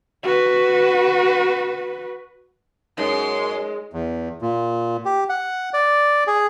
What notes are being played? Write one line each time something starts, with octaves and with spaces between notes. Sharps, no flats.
F#4 B4
F#2 G#3 D#4 C#5 C6
E2
A#2
G4
F#5
D5
G#4